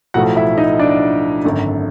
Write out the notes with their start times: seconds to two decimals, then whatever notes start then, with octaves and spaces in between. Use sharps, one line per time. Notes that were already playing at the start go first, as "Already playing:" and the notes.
0.14 B1 A2 F3 A3 F#4 F#5
0.36 E4 E5
0.57 D#4 D#5
0.79 D4 D5
1.44 G#1 F#2 D3